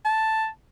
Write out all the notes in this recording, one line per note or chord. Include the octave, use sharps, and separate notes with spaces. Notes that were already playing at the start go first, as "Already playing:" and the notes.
A5